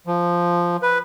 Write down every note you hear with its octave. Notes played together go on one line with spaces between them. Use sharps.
F3
B4